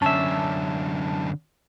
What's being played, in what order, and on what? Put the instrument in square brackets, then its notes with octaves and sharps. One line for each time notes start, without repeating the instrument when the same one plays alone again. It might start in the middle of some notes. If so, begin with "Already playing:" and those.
[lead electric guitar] F#2 D3 [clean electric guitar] C#4 E5 [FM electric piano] A5